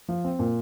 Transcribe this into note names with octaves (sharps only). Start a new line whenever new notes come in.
F3
C4
A#2